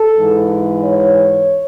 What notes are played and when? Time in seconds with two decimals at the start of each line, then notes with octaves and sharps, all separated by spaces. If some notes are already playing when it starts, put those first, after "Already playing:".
Already playing: A4
0.15 G#2 E3
0.85 C#5